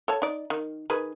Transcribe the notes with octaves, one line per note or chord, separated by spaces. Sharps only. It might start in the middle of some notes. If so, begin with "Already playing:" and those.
A4 C#5 A5
D#4 D5
D#3
D#3 G#4 B4